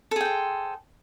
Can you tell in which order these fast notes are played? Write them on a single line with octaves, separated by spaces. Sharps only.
A4 G#4 G5 C5